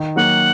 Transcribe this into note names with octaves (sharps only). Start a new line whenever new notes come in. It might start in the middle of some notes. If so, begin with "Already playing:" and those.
Already playing: D#3
F#3 A#3 F#4 F#5